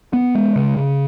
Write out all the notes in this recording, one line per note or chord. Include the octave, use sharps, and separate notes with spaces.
B3
G#3
C#3
C#3